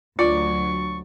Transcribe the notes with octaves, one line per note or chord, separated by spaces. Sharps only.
D2 F#3 F4 D5 C#6